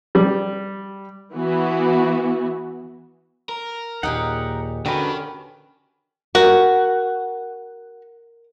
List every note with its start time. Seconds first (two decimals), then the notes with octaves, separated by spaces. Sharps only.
0.15 G3
1.35 E3 B3 F#4
3.49 A#4
4.03 D#2 A#2 D#4 G4 G#4 F#5
4.86 D3 C#4 F#4 G4 A#4 B4 G5
6.35 F#4 A#4